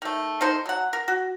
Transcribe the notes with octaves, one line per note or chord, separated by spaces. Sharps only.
D#3 A3
D#3 D#4 A4 C5
F#3 F#5
A#4
F#4